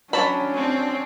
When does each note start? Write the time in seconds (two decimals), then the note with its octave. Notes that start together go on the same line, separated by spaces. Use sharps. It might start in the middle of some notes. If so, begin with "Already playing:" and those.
0.13 F#3 C#4 D4 A5 B5
0.55 C4